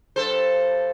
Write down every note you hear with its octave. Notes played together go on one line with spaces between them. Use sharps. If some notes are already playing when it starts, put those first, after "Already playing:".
G2 A4 C5